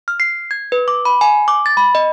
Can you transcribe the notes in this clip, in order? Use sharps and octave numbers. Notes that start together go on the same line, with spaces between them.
F6
C7
G#6
B4
D6
B5
G#5
D6
A6
B5
D#5